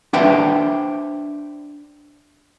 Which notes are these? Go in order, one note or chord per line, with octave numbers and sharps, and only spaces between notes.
D4 B4 C5 E5 F#5 G5